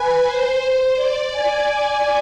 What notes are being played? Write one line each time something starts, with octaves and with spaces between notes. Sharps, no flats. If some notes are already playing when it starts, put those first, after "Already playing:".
Already playing: B4 G#5
C5
C5
D5
G#5